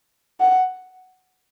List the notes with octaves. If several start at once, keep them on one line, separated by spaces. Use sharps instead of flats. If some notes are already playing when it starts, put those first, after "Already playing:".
F#5